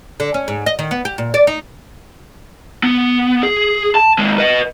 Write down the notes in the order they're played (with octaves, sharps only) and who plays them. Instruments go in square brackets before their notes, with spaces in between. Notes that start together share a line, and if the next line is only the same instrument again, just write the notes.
[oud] D3
C#4
G#2
D#5
D#3
B3
G4
A#2
D5
D#4
[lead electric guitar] B3
G#4
A5
D#2 G#3
B4 D#5